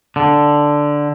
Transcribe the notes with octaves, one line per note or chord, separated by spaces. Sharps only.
D3